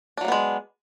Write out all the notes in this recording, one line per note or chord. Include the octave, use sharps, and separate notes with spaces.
F#3 G#3 A#3 B3 D4